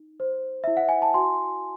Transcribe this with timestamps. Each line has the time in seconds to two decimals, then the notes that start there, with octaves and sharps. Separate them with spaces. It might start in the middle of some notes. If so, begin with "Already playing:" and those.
Already playing: D#4
0.20 C5
0.64 E4 E5
0.77 F#5
0.89 G#5
1.02 A5
1.14 F#4 G#5 C6